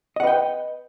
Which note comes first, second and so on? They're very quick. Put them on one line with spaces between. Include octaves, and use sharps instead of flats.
D#5 F#5 B4 G5